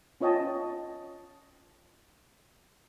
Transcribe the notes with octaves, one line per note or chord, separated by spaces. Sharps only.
C#4 F4 C#5 D#5 G5 A5